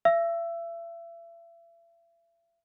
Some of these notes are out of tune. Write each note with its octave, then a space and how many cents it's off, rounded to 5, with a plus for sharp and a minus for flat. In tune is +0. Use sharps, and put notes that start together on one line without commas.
E5 +40 E6 +10